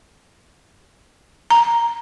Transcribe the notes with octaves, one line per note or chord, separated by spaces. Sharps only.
A#5